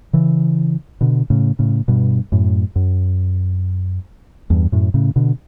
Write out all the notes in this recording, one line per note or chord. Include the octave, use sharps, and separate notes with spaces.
C#3 E3
B2 D3
A2 C#3
A2 C#3
G2 B2
F#2 A2
F#2
E2 G2
F#2 A2
A2 C#3
B2 D3